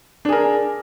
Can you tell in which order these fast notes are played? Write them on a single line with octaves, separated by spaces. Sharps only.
D4 G#4 A#4